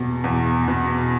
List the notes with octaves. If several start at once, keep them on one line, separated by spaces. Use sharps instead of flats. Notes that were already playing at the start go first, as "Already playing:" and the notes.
Already playing: E2 B2
E2
B2